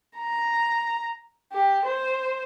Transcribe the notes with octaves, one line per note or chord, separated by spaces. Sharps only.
A#5
G4
C5